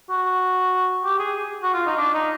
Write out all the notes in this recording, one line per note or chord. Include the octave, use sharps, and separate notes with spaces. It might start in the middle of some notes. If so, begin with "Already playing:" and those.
F#4
G4
G#4
F#4
F4
D#4
D4
D#4